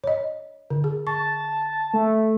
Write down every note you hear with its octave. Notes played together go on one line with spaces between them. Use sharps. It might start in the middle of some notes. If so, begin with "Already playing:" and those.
C#5 D#5
D3
G#4
A5 C#6
A3